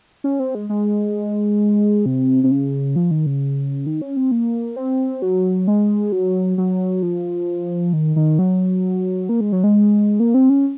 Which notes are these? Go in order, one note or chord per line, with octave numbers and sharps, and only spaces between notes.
C#4
C4
G#3
G#3
C3
C3
C#3
F3
D#3
C#3
D#3
C#4
C4
A#3
C4
F#3
G#3
F#3
F#3
F3
D#3
D#3
F#3
A#3
G#3
F#3
G#3
A#3
C4
C#4